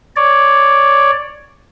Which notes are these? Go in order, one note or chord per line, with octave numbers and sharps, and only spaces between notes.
C#5 D5